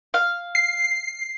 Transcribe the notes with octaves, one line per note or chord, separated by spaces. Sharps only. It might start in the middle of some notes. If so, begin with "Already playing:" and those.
F5
C7